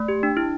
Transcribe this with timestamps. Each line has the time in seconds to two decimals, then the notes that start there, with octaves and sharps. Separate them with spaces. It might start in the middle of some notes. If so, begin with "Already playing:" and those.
Already playing: A3
0.08 G4
0.23 D4
0.37 E4